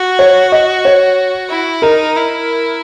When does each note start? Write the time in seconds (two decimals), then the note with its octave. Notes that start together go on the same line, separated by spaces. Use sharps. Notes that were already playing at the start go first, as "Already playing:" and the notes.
Already playing: F#4
0.19 C#5
0.52 D#5
0.85 C#5
1.49 E4
1.82 D#4 A#4
2.16 E4